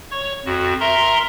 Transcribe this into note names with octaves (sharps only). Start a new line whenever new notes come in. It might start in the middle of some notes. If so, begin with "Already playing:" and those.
C#5 C#6
F2 F#4
A#4 E5 A#5 C6